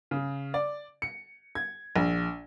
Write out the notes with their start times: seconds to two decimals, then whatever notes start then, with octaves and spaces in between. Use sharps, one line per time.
0.11 C#3
0.54 D5
1.02 C#7
1.55 G#6
1.96 A#1